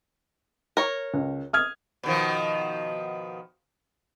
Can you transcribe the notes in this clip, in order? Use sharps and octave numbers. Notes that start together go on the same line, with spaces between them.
A#4 C#5
C#2
D#6 F6 G#6
B2 D#3 F3